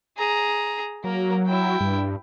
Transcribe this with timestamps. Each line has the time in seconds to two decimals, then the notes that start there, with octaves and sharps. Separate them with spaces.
0.17 G#4 A#5
1.04 F#3 A#3 A#4
1.47 E4 G5
1.80 G2